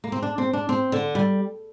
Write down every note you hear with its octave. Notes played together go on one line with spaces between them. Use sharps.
A#3
C4
D4
C4
D4
C4
D3
G3